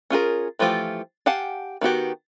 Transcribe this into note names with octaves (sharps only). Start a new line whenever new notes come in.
C#4 F4 G#4 A#4
E3 F3 A3 F4 G4
G4 F5 F#5 G#5 A5
D#3 B3 F#4 G4